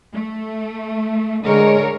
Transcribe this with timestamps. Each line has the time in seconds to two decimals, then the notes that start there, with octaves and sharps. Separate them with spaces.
0.14 A3
1.46 D3 G#3 A#4 C#5